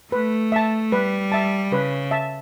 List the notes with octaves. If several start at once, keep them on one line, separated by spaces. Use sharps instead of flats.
A3 B4
E5 A5
G3 B4
E5 A5
C#3 B4
E5 A5